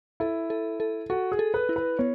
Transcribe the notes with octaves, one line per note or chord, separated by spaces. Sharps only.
E4 A4
A4
A4
F#4 A4
G#4
A4
B4
E4
B4
B3 C#5